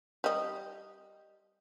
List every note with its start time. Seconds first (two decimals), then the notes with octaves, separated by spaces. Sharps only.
0.24 G3 D#5